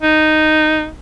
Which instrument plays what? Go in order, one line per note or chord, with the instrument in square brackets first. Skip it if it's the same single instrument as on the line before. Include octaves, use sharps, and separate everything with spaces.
[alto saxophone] D#4